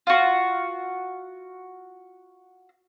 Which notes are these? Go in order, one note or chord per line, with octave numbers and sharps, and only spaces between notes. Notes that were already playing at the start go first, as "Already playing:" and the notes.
F4 F#4